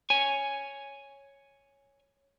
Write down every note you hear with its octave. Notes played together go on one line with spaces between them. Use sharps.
C#5 G#5